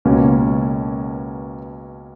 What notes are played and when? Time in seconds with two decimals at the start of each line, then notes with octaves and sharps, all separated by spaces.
0.05 C#2 B2 A#3 C#4